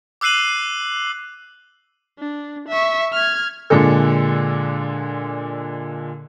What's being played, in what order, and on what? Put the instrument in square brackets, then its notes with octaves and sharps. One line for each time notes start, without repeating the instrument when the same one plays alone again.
[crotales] D6 E6 F#6 C7 D#7 F#7
[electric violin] D4
E5 C#6
F6 G#6
[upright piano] A#2 D3 G#3 A4